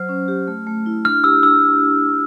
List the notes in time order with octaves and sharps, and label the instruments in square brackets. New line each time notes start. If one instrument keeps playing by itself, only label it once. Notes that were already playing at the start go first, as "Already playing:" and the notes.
Already playing: [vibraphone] F#3 C5 [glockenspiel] F6
[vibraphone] C#4
G4
A3
A3
E4
[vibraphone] D4 [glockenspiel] F6
[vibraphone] G4 [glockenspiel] E6
[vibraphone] D4 [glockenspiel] E6